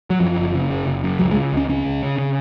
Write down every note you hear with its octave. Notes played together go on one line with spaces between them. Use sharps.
F#3
F#2 F3
F#1
C#3
F#1
F#1
F#2
C#2 F#3
G#3
C#3
C#2 C#4
C#2 C#4
C#2
C#3
C#3